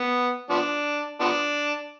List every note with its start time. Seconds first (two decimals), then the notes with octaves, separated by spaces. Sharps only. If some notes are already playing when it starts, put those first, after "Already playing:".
Already playing: B3
0.50 F3 B3 D4
1.21 F3 B3 D4